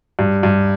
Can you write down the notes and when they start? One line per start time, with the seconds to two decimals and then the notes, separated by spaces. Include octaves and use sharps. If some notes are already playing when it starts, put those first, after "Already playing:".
0.19 G2
0.43 G2